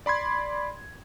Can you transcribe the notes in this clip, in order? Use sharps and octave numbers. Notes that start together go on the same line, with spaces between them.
D5 B5 C6 G#6